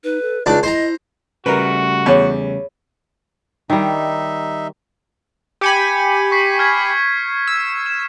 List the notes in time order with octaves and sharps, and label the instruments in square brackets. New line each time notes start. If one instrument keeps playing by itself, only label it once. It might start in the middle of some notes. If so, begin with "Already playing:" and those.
[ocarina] D#4 [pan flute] B4
[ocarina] A4
[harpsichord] C#2 D4 [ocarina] D#4 [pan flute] D5
[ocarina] E4 [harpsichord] C5 A#5 [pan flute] D#5
[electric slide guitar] C#3 G3 A3 [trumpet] F#4 [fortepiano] A#4 B4
[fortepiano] E2 [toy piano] C#5 B5
[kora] D#3 G3 [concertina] D#4 E5
[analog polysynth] G4 G#5 B5 [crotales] G6 C#7 D#7
[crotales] C#6 B6 C7
F6 G#6 B6
[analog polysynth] E6
[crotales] E7